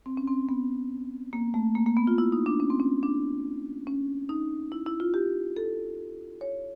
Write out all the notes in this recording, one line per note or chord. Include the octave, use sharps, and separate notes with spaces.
C4
C#4
C4
B3
A#3
A3
A#3
A#3
B3
F4
E4
D#4
D4
C#4
C4
C#4
D4
C#4
D#4
E4
E4
F4
G4
A4
C#5